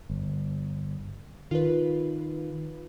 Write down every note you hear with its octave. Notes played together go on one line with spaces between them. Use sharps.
G1
D#3 F4 B4